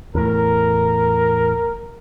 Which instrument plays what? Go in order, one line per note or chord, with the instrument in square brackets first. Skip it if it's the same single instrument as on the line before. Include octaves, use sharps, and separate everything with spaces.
[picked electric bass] E2 A2 [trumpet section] A#4